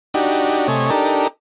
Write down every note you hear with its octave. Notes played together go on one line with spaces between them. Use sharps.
D4 D#4 F#4 G4
C3 A3 C#5 D#5 G#5
D4 D#4 G4 A4 A#4